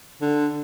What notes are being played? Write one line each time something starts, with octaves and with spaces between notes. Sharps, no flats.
D3